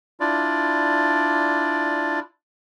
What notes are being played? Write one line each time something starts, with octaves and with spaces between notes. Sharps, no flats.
D4 E4 F4 D5